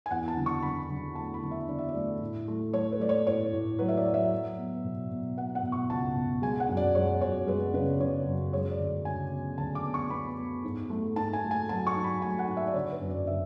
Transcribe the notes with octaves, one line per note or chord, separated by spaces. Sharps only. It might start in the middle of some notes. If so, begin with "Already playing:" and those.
G#5
E2 F#5
A5
D3
C#6
D3 B5
D3
A3 A5
B5
D3
E5
D3 D5
E5
D5
A3
A2
A3
A3 C#5
B4
A3 D5
C#5
A2 C#5
A2
F#3 B4
E5
D5
F#3
E5
F#3
B3
B2
B2
B3 F#5
F#5
B2
C#6
C#2 A5
B2
G#3 G#5
F#5
F#2
D5
G#3 C#5
F#2 C#5
G#3 B4
C#3 B4
C#3 C#5
F#2
G#3 C#5
D5
D2
C#3 G#5
B3
D2 A5
D6
B3
C#6
B3 B5
B3
G#2
A3
G#2 A5
G#5
A3
G#5
F#3 A5
C#6
G#2
B5
A3 G#5
F#5
G#2
E5
D5
D3 C#5
B4
F#2
D5
D3 E5